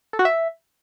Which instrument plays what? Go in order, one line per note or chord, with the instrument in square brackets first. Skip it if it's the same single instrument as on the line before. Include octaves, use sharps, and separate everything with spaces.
[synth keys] A4
F#4
E5